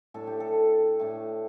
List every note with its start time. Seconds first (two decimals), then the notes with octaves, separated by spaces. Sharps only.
0.14 A2 A3 D4 A4
0.27 G4
0.40 A4
1.00 A2 A3 D4